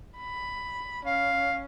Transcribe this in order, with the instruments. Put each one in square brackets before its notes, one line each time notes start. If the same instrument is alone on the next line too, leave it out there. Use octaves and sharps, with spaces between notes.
[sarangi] B5
[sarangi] C#4 [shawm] F5